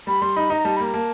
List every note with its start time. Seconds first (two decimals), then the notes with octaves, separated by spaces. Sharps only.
0.07 G3 B5
0.22 G3 C6
0.36 D#4 B5
0.50 D#4 A#5
0.65 G3 A5
0.77 A#3 B5
0.85 A#5
0.94 A#3 A5